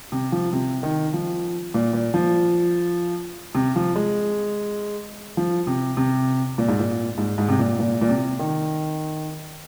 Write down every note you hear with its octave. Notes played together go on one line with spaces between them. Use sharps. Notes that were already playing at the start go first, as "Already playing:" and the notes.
C3
F3
C3
D#3
F3
A#2
A#2
F3
C3
F3
G#3
F3
C3
C3
A#2
G#2
A#2
G#2
G#2
C3
A#2
A#2
A#2
C3
D#3